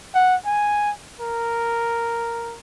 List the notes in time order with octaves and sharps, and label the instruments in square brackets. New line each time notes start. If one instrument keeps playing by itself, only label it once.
[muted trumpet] F#5
G#5
A#4